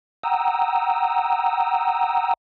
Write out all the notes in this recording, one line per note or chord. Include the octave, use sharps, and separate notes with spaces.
F#5 G5 A#5 D#6 E6